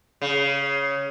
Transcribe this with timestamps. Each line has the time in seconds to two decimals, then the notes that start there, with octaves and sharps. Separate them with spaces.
0.22 C#3